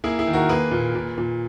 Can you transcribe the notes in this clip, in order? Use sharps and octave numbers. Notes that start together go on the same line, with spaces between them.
A#3 E4 G#4
E4 G#4
D#3
F#4 A#4
A#3 G#4 B4
A#2
A#2
A#2